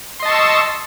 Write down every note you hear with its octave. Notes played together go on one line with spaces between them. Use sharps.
D#5 A5 C6 C#6 E6